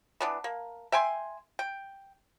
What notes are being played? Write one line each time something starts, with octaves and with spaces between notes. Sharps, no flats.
E3 B3 D4
A#3
E5 G5 G#5 C6
G5